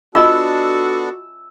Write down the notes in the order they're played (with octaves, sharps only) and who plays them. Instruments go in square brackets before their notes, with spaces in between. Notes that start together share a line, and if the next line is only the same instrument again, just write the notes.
[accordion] B3 D4 A4 [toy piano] F4 D#5 [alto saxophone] F#4 [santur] E6